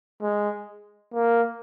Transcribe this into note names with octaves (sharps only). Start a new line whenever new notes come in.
G#3
A#3